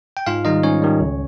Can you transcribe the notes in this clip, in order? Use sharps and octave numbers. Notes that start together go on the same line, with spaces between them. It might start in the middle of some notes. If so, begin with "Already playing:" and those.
G5
G#2 F4 F5
D#3 G3 D#4 D#5
G#2 C#4 C#5
D#3 G3
C#2